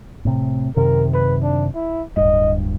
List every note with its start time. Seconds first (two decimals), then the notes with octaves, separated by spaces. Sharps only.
0.25 A2 C3
0.76 F#2 C3 D#3 A#4
1.14 B4
1.43 D4
1.75 E4
2.17 D1 G2 D#5